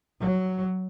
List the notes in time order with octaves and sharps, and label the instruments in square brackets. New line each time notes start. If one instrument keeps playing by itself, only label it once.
[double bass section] F#3